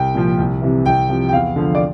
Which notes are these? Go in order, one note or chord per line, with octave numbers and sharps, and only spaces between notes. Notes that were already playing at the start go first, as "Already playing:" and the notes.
Already playing: C2 G5
A#2 F3
C2
C3 E3
C2 G5
C3 F3
G5
E2 F5
D3 F3
D5